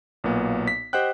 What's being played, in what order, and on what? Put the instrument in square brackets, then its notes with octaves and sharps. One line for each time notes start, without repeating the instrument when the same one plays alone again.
[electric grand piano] B1 A#2 A#3 B3
B6
G4 C5 D#5 F#5 G5 F#6